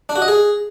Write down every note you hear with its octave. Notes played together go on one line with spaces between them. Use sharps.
D4
F#4
D#5
G#4